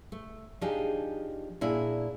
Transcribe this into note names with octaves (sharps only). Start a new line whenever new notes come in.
A3
F3 D4 D#4 G4 G#4
A#2 D4 E4 G#4